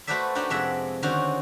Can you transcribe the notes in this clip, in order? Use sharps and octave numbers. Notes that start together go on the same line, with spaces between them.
A3 F#4 B4 C5 D5 E5
D4 D#4 F#4 G4 F#5
F2 C3 G#3 E5 F#5
D3 D#3 C#4 F#4 C5 F5